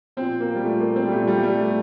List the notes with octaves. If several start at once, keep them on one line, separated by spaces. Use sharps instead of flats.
A#2 F3 C4
A#3
G3
A#2 F3 A3
A#3
C4
G3
A#2 F3 A3
G3
A3
G3
A#2 F3 A3